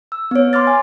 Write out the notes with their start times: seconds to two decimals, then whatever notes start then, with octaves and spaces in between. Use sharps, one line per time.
0.12 E6
0.31 B3 C#5
0.53 C6 D6 F6 A6
0.67 G#5